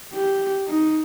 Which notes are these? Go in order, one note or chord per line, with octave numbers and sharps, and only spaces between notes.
G4
D#4